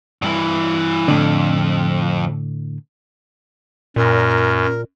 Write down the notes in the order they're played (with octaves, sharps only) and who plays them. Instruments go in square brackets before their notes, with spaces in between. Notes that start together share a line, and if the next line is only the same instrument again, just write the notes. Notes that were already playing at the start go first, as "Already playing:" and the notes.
[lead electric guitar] G2 E3
[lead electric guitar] F2 [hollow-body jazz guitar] A2 D3
[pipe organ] F#2 [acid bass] A#2 [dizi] A#4